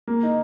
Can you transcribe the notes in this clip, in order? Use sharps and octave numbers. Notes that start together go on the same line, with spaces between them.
A#3
D#4